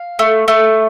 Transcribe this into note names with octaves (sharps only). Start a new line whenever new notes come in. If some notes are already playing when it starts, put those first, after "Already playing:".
Already playing: F5
A3
A3